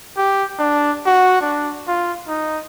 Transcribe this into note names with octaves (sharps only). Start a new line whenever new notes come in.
G4
D4
F#4
D4
F4
D#4